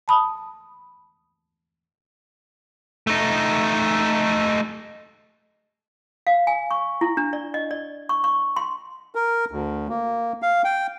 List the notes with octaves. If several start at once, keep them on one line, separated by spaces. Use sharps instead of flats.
A5 B5 D#6
A3 D#4
F5
G#5
C#6
E4
D4
D5
D#5
D5
C#6
C#6
C6
A#4
D2
A#3
F5
G5